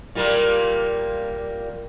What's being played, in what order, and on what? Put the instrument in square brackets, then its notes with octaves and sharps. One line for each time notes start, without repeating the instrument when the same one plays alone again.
[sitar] A#2 G3 A#3